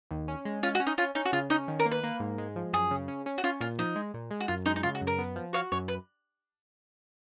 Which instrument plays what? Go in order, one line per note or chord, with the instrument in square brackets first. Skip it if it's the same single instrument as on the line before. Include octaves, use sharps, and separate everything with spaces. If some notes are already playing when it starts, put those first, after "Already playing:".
[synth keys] D#2
C#4
G#3
[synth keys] C#4 [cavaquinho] F4
[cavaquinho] F#4
[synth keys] C#4
[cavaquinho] D#4
[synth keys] C#4 [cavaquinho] F4
[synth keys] C#4 [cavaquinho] D#4
[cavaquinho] F#4
[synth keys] C#3 [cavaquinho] F4
[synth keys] C#4 [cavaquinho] D#4
[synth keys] D#3
[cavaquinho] A#4
[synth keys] A#3
[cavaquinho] B4
[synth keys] A#3
G#2
G#3
F3
[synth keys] F#2 [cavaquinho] G#4
[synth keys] C#3
C#4
C#4
[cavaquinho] F#4
[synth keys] C#4 [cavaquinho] F4
[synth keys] A#2 [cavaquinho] F4
[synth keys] F3 [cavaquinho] D#4
[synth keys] G#3
A#2
G#3
[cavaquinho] F#4
[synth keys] F#2 [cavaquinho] F4
[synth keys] G#3 [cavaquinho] D#4
[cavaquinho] D#4
[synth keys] C#3 [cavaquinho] F4
[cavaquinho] F#4
[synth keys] F#2
[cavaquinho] A#4
[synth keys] B3
F3
[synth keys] F#4 [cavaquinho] C#5 F5
[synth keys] F#2 [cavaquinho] C#5
[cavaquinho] B4